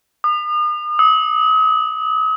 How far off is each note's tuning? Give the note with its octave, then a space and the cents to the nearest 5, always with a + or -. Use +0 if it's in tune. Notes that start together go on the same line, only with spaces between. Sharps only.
D#6 -40
D#6 +45